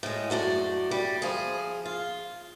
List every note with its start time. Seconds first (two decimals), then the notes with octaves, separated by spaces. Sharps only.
0.03 A2 G#3
0.30 F#2 A3 B3 D4
0.91 G3
1.22 F3 G#4
1.85 F4